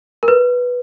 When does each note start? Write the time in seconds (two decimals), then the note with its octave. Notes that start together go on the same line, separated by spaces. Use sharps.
0.23 A#4
0.28 B4